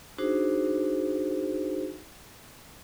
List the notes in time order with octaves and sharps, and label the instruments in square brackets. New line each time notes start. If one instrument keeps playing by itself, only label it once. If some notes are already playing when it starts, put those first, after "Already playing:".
[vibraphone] D4 D#4 F#4 G#4 C5